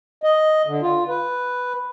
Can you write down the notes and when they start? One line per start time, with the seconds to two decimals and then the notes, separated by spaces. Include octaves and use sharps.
0.23 D#5
0.67 D3
0.82 F4
1.08 B4